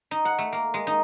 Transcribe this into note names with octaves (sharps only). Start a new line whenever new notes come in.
D#4
F#5
A3
A#3
G#3
D#4